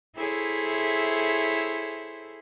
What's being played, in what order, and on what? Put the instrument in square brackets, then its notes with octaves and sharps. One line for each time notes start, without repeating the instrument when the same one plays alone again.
[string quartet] E4 G#4 A4 C5 C#5 E5